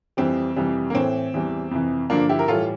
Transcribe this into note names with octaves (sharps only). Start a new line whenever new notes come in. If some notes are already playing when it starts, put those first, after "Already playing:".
F2 E3 G3 C4
F2 C3 E3 G3
A#3
A2 E3 A3 C4
E2 E3 G3
F2 C3 E3
G2 D3 F3 A#3 D4
E4 G4
A#4
A2 E3 G3 F4 A4